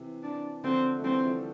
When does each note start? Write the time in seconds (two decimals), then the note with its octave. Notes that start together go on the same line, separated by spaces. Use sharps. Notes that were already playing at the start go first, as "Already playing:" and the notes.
Already playing: C3 E3
0.23 D4
0.64 D3 F3 C4
0.98 A3
1.04 E3 G3 C4
1.25 F3 A3